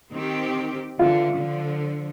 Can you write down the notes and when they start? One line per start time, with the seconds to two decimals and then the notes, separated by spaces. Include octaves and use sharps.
0.11 D#3 C4 G4
0.99 D3 E3 F4
1.36 D3 F3